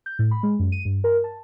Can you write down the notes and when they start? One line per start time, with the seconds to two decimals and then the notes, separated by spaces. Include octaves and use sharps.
0.06 G6
0.19 A2
0.31 B5
0.43 G#3
0.59 F#2
0.72 D#7
0.85 G2
1.04 A#4
1.24 A5